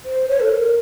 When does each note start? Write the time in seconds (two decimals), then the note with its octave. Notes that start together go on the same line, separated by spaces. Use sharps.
0.05 C5
0.28 C#5
0.40 A4
0.51 A#4